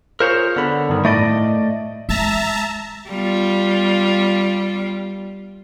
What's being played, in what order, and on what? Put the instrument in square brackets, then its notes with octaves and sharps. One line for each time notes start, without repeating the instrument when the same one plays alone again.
[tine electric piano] F4 G#4 [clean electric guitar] A#4 C5 C#5
[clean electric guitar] D3 [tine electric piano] B3 B5
[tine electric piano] G2 D#3
[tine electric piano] A2 [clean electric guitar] A3 D5 D#5
[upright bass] G#3 [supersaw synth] E5 A5 A#5
[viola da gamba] G3 B3 F4